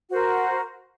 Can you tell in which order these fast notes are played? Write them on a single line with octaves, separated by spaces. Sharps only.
F#4 C5 A#4